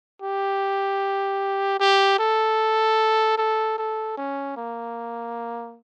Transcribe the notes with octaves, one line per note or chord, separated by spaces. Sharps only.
G4
G4
A4
A4
A4
C#4
A#3